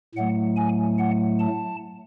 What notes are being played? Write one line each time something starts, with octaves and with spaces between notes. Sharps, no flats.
A2 F#3 A3 F#5
G#5
F#5
A5